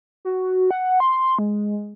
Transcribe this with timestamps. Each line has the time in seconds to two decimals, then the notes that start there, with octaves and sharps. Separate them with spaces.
0.25 F#4
0.71 F#5
1.00 C6
1.39 G#3